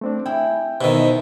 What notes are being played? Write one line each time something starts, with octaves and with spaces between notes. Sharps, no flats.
A3 C4 D4
E4 G#4 G5
B2 D#3 E4 C5 E5